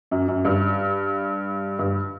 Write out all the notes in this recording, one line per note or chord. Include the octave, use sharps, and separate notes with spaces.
F#2
F#2
G2
G2